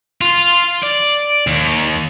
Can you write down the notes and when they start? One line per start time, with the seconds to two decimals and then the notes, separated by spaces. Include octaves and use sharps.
0.21 F4
0.83 D5
1.47 D#2